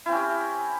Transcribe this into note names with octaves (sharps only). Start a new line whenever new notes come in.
C4 C#4 E4 G4